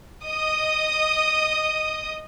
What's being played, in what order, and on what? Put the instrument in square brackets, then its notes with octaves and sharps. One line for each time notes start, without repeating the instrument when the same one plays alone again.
[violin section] D#5 D#6